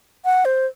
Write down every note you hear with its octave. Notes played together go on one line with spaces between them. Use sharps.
F#5
C5